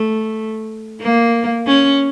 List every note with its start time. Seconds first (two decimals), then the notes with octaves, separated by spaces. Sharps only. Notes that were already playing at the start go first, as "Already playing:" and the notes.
Already playing: A3
1.02 A#3
1.67 C#4